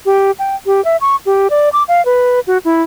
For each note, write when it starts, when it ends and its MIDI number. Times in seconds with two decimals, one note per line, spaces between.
0.06 0.31 67
0.39 0.55 79
0.66 0.83 67
0.85 0.97 76
1.01 1.16 85
1.26 1.48 67
1.50 1.69 74
1.73 1.83 86
1.88 2.04 77
2.05 2.40 71
2.47 2.58 66
2.65 2.83 64